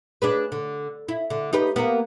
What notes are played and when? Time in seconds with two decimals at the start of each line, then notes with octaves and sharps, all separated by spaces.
0.22 D4 G#4 B4
0.52 D3
1.08 E4
1.30 D3
1.53 D#4 G4 B4
1.76 A#3 B3